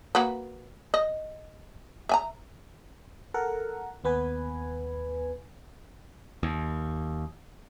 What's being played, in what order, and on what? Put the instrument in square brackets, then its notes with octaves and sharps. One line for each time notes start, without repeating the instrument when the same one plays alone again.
[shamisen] A#3 F#4 B4
D#5
E5 G#5 A#5
[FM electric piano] A4 A#4 F#5
D#2 B3 B4 G#5
[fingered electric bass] D#2